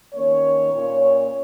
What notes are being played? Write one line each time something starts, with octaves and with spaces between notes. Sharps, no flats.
D#3 A#3 C#4 C#5
A#2 A#3 C#4